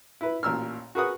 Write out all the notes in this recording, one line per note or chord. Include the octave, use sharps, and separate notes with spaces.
E4 B4
A1 A#2 E6 F6
F#4 G#4 A#4 B4 F#5 D#6